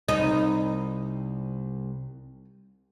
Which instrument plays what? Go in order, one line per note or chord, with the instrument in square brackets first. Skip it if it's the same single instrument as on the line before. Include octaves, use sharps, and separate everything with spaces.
[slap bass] C2 [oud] D#4